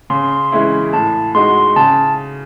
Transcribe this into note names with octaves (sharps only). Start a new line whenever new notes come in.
C#3 C6
C6
E3 G#3 C#4 E4
A2 A5
G#3 D#4 F#4 C6
C#3 A5